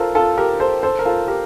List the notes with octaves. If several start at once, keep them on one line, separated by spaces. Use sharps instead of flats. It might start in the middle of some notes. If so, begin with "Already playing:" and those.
Already playing: F4 A4 A#4 C5
F4 A4
G4 A#4
A4 C5
A4 C5
A#4
F4 A4
G4 A#4